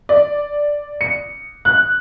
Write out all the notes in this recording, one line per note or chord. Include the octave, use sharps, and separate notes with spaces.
D5
C#7
F#6